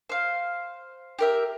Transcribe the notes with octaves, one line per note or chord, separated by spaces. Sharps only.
C5 F5
G4 A#4 E5